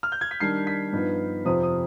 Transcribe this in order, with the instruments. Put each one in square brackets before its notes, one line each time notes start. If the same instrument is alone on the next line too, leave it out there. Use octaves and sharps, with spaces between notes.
[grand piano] F6
G6
G#6
B6
D#3 G3 D4 C7
B6
G2 F3 B3 D#4
F2 C3 F3 C4 D#6
D#6